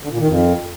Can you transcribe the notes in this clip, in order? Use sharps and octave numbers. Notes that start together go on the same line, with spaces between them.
D3
A#2
D#3
F2